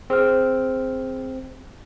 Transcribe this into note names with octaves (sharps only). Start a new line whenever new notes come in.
C4 G#4 C5 F6